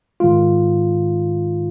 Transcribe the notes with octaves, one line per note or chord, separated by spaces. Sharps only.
G#2 D#3 G#3 F4